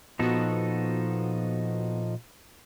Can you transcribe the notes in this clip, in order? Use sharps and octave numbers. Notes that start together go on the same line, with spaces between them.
A#2 F3 B3 D#4 F#4 A4